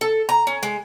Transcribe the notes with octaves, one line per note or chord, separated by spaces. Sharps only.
A4
A#5
C#4
G#3